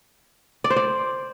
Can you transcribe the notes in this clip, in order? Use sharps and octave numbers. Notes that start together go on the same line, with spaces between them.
D5
C5
D5